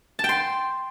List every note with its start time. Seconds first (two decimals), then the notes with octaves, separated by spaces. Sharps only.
0.19 A5
0.24 G5
0.29 C6